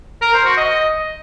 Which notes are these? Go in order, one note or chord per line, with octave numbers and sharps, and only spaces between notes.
A#4
C5
F#4
D#5